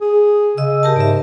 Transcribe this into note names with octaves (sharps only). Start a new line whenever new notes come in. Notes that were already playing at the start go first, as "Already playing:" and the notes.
G#4
C#3 D#5 E6
G4 A#4 A5
G#2 D5 E5